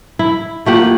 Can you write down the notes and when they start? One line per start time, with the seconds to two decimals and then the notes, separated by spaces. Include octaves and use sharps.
0.19 E4
0.66 A3 A#3 F4 G4 F#5